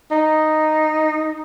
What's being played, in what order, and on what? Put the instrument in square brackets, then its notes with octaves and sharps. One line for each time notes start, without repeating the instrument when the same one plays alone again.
[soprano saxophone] D#4